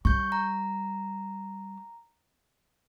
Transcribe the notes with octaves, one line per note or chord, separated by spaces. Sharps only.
G3 C#6 G6
A#5